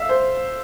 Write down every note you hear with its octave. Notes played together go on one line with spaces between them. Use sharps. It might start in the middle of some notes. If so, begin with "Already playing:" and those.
Already playing: E5 F5
C5